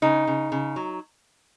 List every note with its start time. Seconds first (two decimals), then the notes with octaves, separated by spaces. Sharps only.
0.02 C#3 D#4
0.27 C#3
0.52 C#3
0.76 F#3